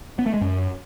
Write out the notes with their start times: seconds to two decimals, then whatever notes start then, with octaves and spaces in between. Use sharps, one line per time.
0.19 B3
0.26 A3
0.34 G#3
0.41 F#2